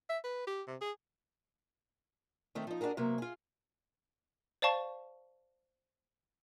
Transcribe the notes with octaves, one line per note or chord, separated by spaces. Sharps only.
E5
B4
G4
C3
G#4
D#3 A3 C4
F3 D#4
D4 F4 F#4 G#4 A#4
C3 F#3 A#3 B3
F4 G#4
C5 D5 F5 A5 C#6